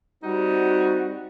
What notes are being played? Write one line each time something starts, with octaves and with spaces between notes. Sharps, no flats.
G3 C4 D#4 F#4